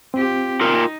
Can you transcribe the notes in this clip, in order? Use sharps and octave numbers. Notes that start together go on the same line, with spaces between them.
C4 F4 G4
D#4 F4 A#4 G5